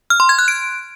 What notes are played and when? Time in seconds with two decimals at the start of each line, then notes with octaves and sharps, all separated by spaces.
0.10 F6
0.20 C6
0.29 G#6
0.39 F#6
0.48 D7